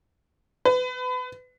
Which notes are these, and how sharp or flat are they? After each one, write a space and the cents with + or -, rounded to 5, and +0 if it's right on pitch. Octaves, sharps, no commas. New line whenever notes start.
B4 +30